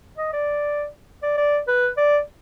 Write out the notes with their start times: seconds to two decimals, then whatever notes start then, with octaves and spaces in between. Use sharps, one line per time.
0.18 D#5
0.33 D5
1.23 D5
1.37 D5
1.67 B4
1.97 D5